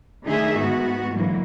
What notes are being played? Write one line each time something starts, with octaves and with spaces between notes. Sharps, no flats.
D3 D#3 A3 D#4 G#4 E5
G#2 B3 F#4
G#2 D3 E3 F#3 A#3